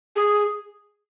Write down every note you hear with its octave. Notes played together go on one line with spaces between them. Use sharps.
G#4